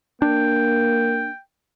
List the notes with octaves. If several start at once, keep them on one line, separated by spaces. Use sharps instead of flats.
A#3 D4 G5